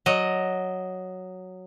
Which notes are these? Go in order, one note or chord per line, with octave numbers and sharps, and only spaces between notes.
F#3 D#5